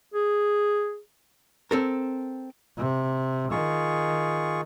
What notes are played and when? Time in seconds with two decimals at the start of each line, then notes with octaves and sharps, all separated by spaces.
0.14 G#4
1.71 C4 A4 A#4
2.77 C3
3.51 D#3 F4 G#4 C#6